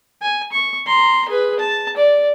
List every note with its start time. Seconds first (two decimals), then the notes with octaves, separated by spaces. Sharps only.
0.22 G#5
0.52 C#6
0.87 A#5 C6
1.29 G#4 B4
1.59 A5
1.97 D5